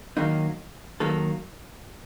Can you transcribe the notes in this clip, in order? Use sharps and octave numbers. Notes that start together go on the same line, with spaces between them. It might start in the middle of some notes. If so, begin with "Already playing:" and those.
D#3 F#3 A#3 D#4
D#3 F#3 A#3 A4